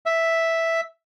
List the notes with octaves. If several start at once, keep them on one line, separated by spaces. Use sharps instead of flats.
E5